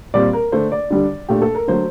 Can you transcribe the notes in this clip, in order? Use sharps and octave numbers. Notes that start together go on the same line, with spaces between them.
A#2 G3 C4 D5
A#4
D3 A3 D4 C5
D5
D3 G3 D4
A#2 A3 D4 G4
A4
A#4
D3 F#3 A3 C5